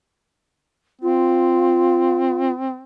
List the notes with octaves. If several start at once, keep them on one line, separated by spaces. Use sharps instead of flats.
C4 F4